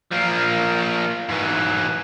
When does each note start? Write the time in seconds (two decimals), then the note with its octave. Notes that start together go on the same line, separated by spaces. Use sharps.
0.11 F3 A#3
1.29 G#2 E3